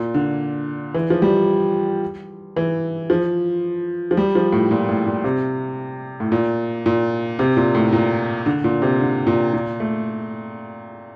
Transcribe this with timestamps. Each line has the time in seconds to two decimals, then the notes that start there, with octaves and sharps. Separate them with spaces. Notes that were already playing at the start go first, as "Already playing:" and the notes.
Already playing: A#2
0.14 D3
0.94 E3
1.10 F3
1.22 G3
2.56 E3
3.10 F3
4.11 F3
4.17 G3
4.35 F3
4.52 A2
4.71 A#2
4.89 A2
5.06 A#2
5.24 C3
6.20 A2
6.32 A#2
6.86 A#2
7.39 C3
7.57 A#2
7.75 A2
7.93 A#2
8.46 D3
8.64 A#2
8.82 C3
9.00 D3
9.27 A#2
9.53 A#2
9.80 A3